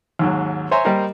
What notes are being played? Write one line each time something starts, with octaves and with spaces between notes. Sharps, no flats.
D#2 G#2 F#3
C5 C#5 E5 G#5 A#5 C6
G3 A#3 G4 A#4 C5 D#5